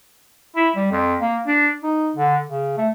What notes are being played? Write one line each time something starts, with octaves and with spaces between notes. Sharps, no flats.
E4
G3
F2
A#3
D4
D#4
D3
C#3
A3